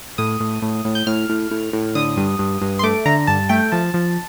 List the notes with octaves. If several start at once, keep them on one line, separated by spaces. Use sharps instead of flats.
A2 D#6
A2
A2
A2
G6
A2 F6
A2
A2
A2
D3 D#6
G2
G2
G2
C6
A3 D6
D3 A#5
G2 A5
A3 G5
F3 A5
F3